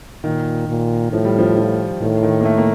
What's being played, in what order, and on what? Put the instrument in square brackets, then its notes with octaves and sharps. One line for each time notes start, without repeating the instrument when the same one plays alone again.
[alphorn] A#2 [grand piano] D#3
[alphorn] A#2
[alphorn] A2 [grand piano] F3
[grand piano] G3
F3
F3
[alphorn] A2 [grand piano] D#3
[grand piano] D#3
A#3
A3
A#3